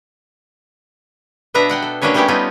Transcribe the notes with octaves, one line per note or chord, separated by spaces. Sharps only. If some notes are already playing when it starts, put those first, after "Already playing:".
B2 B3 D4 B4 E5 A#5
D5 F#5 G5
A4
F#3 A#3 C#4 D4 B4 C#5
G3 A3 B3 C#4 E4 G4
G3 A3 B3 D#4 F4